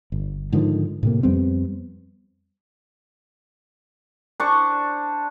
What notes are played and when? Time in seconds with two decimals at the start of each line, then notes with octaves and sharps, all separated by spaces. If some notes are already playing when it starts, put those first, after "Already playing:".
0.12 G1
0.53 G#2 D3 D#3 F3
1.03 A2 C3 A#3
1.23 F2 G3 B3 C4
4.40 D4 C5 C#6